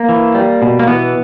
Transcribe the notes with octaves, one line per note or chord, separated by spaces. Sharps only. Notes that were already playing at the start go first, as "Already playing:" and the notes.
Already playing: A#3
E3
G3
B2
A#3
E3 B3